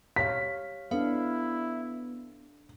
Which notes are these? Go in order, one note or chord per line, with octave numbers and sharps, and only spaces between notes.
G4 C#5 F5 B6
B3 D4 E4 A4 F5